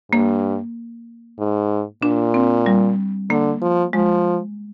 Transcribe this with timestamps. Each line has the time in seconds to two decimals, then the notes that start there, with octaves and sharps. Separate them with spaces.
0.12 G2 A#3
1.39 G#2
2.02 A#2 D4
2.34 C4
2.66 G3
3.30 D3 A#3
3.62 F3
3.93 F3 G#3